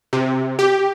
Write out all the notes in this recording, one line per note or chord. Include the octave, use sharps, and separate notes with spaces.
C3
G4